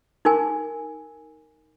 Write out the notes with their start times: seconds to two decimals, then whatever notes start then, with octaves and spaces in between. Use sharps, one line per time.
0.25 D#4 A#4 G#5